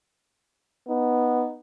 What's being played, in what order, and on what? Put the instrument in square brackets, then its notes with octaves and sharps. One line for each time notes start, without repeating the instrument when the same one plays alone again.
[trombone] B3 [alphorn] D#4